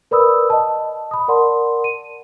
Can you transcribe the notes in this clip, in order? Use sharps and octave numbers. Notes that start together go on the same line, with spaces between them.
A#4 B4 D5 B5 D#6 E6
D#5 A5
B5 D#6
A#4 D5 F#5 A5 C6
D#7